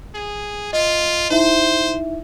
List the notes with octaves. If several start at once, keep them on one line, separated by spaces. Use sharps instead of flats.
G#4
F4 D#5
D#4 E4 C5 E5